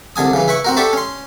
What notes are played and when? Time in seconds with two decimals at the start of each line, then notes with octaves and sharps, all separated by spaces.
0.16 C2 D3 G#5 D#6
0.33 C#3 E3
0.48 E4 B4 C#6
0.64 C4 F#4 A#4
0.77 D4 G4 A4 E5 C#6
0.93 C#4 C6